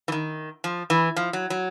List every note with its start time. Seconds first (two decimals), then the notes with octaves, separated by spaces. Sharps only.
0.08 E3
0.12 D#3
0.64 F3
0.90 E3
1.16 F3
1.33 F#3
1.50 F#3